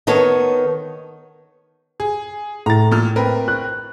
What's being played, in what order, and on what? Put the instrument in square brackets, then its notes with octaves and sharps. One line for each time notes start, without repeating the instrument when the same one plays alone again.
[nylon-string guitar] D#3 B3 A4 C#5
[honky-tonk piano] G#4
[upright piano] A2 [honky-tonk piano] A#5 A6
[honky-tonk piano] A#2 A4 F6
C4 A#4 B4
[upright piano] F#6